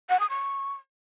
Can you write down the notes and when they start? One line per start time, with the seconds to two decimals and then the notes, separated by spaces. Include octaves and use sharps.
0.10 F#5
0.20 D#6
0.30 C#6